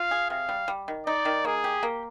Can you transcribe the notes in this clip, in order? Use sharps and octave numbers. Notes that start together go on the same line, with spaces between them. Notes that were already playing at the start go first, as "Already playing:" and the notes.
Already playing: F4 F5
G#4
C3 F5
G3
G3
D#3
D#4 D5
D#3
A#3 G#4
G4
A#3